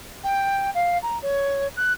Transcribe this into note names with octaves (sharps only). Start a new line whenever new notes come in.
G5
F5
A#5
C#5
F#6